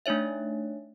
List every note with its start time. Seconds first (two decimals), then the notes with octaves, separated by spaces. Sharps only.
0.06 A3 D4 D#4 C#5 E5